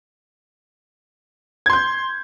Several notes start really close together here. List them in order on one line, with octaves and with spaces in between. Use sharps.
G#6 C6 G6